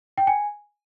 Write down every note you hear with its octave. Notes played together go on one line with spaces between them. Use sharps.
G5
G#5